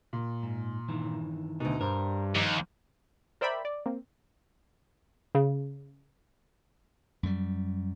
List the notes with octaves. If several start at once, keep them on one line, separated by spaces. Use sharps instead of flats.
A#2
G#2
G2 D#3 E3
D2 B2 D#4
G2 A#4 C5
D#2 F3
A#4 C5 D5 E5 G5 B5
D5
A#3 C4
C#3
F#2 G3